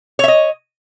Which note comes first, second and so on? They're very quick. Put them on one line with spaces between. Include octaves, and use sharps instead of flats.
C#5 E5 D#5